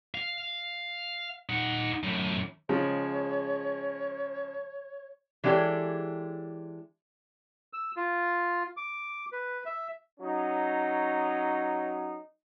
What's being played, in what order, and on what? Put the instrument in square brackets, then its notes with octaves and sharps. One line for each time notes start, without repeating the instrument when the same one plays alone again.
[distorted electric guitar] F5
D#4 F#5
F#2 A2
[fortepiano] C#3 F3 G#3 [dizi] C#5
[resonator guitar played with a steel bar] E3 G#3 D4 G4 A4 C#5
[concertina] E6
F4
D6
B4
E5
[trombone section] F#3 C#4 D#4